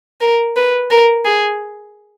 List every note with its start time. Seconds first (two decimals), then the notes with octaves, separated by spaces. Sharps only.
0.21 A#4
0.56 B4
0.90 A#4
1.25 G#4